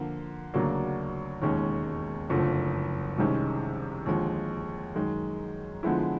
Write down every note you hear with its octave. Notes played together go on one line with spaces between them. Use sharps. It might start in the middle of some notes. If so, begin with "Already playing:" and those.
Already playing: D3 F3 A#3
D2 C#3 F#3 A#3 D4
E1 D#2 D#3 G#3 C#4
F#1 F2 D3 F3 A3
C2 C3 D#3 G#3 C#4
D#2 D3 F3 G#3
F#2 D#3 G#3
D3 F3 G#3 B3 E4